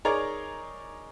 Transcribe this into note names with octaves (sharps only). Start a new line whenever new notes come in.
D#4 G#4 A#4 C#5 D5 A#5